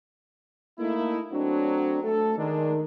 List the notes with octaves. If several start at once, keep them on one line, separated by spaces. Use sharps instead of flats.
A3 A#3 D#4 E4
F#3 A3 C4 D4 F#4
A3 A4
D#3 G#3 D4 D#4